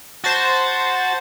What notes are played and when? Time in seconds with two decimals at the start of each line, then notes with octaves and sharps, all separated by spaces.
0.24 F#4 C5 A5 A6